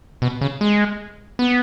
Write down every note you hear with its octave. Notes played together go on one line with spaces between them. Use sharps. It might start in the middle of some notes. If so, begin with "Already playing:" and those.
B2
C#3
G#3
B3